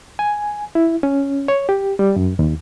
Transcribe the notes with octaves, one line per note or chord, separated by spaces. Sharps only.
G#5
E4
C#4
C#5
G4
G3
F#2
D#2